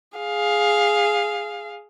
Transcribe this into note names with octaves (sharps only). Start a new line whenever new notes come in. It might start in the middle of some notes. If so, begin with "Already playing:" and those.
G#4 F5